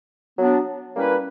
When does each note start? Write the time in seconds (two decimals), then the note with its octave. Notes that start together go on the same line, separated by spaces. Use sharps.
0.37 F#3 B3 D4
0.96 G3 A#3 C#4 E4 B4